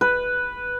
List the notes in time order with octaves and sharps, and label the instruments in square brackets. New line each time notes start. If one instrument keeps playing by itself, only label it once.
[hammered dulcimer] B4